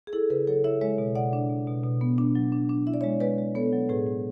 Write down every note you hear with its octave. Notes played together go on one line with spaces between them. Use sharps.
G#4
E4 A4
C#3 G#4 B4
F#3 A4 C#5
E4 C#5 E5
G#3 C#5 E5
B2
B2 D5 F#5
D4
B2
B2
B2
B3
D4
F#3
D4
D4
E4 E5
D5
G#3 C#5 E5
G#3 B4 D5
G#3
B3 A4 C#5
F#3
A2 G#4 B4
A2